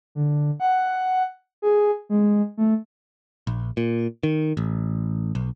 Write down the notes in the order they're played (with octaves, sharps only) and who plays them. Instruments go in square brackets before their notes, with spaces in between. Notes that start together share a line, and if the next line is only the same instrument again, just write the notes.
[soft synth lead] D3
F#5
G#4
G#3
A3
[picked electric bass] A#1
A#2
D#3
A1
B1